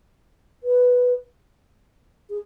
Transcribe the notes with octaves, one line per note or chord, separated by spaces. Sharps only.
B4
G#4